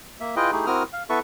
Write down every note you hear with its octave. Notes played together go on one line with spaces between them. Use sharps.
A#3 E5
E4 F4 G#4 B4 D#5 G5
A3 D#4 E4 G4 G#4
C4 E4 F#4 A#4 D#6 F6
F5
B3 E4 A4 B4 E5 C#6